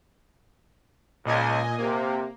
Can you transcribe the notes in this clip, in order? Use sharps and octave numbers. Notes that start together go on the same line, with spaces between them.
C#2 A#2 D#5 G#5
C3 A#3